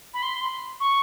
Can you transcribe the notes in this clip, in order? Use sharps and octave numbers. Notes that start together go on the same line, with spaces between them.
B5
C6
C#6